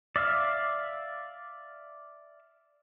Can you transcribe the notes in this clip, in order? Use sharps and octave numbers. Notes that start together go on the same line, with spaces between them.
D5 E5 F5